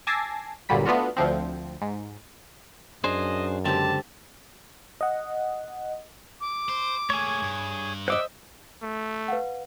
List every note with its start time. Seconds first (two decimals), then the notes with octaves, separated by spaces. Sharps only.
0.07 G#5 A5 D6 E6 A#6 C7
0.69 G1 A#2 D3 F#3 G3 B5
0.85 A3 B3 D4 F4 F#4
1.16 D2 F3 C4
1.82 G#2
3.04 F#2 D4 G#4 C5 D#5
3.65 C#2 D3 C4 G4 A5
5.01 D#5 F#5
6.41 D6
6.69 C5
7.10 A3 A#3 G#4 C#5
7.43 G2
8.08 C5 C#5 D#5 E5 F#5 D6
8.83 A3
9.28 B4 F5 F#5